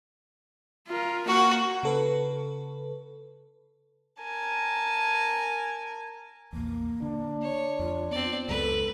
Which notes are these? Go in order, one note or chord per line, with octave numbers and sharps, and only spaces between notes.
F4 A#4
A#3 F#4 F#5
C#3 A4 B4
A#4 G#5 A5
A#1 E2 A#3
D3 D4
C#5
F2 F4
B3 C4 D5
C#2 F#2 G#3 A4 B4